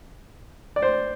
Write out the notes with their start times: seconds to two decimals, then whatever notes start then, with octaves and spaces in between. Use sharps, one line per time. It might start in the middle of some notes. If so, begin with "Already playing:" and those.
0.76 D5
0.82 C5